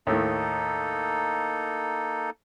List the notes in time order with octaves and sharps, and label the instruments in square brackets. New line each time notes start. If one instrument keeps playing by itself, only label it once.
[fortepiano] D#2 A2 [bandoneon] A#3 D#4 A4